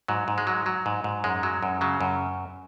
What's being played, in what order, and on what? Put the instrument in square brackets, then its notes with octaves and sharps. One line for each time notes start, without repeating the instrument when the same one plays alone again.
[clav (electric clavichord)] G#2 F#3
G#2
G#3
F#3
F#3
G#2
G#2
F#2 G#3
F#3
F#2
C#3 F#3
F#2